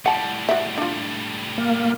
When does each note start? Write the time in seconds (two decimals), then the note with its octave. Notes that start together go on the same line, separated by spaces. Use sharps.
0.06 A2 G3 F#5 A5
0.49 F#4 E5
0.78 D4 F4
1.58 A#3